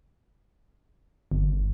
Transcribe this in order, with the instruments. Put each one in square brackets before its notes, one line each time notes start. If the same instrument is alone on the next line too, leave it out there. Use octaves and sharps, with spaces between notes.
[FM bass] G1